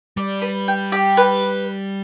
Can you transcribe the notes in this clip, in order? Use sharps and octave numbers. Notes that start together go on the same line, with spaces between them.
G3 D5
B4
G5
G4
B4